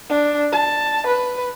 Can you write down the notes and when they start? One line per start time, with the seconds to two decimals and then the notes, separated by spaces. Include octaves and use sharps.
0.10 D4
0.53 A5
1.07 B4